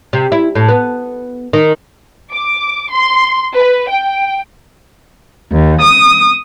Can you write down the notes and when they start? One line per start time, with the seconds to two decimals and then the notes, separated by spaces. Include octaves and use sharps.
0.13 C3
0.32 E4
0.55 A2
0.68 B3
1.53 D#3
2.33 D6
2.92 C6
3.55 B4
3.91 G5
5.52 D#2
5.81 D#6